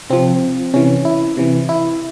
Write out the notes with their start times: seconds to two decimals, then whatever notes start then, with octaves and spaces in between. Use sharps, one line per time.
0.10 C3 F3 C4
0.74 C3 E3 C#4
1.05 E4
1.37 C3 E3
1.69 E4